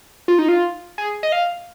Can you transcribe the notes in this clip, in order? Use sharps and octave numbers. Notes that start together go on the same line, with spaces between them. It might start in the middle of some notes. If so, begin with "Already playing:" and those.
F4
D#4
F4
G#4
D#5
F5